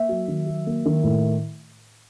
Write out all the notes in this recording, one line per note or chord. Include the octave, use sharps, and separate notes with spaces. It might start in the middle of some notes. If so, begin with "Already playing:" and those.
Already playing: A#3 E5
F#3
D#3
F#3
A#3
D#3
A2